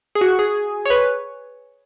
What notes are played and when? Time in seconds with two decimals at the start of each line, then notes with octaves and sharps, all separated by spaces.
0.15 G#4
0.21 F#4
0.39 G#4
0.86 C#5
0.90 B4